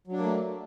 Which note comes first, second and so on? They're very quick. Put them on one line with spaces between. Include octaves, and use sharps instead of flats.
F#3 D4 A#3 A3